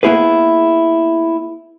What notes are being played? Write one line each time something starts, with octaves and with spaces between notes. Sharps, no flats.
A#3 B3 E4 G#4 B4